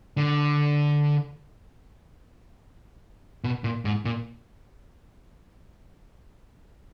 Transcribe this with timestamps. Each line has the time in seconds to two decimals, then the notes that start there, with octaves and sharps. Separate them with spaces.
0.17 D3
3.44 B2
3.64 A#2
3.85 G#2
4.05 A#2